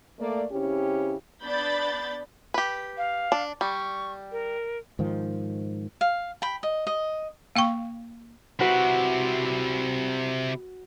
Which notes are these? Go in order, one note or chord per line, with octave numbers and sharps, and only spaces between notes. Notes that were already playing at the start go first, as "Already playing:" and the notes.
A3 A#3 D5
C#3 C4 C#4 E4 G4
B3 D4 B5 G6 A6
G4 B4
F5
D4
G3 C#6
A#4
G#2 D#3 F3
F5
G5 B5
D#5
D#5
A#3 F5 G5 C#6
C3 E4 F#4 B4